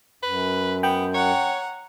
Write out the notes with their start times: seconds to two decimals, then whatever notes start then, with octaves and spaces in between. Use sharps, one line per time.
0.23 F#2 B4
0.83 B3 G5
1.14 C#5 F#5 A#5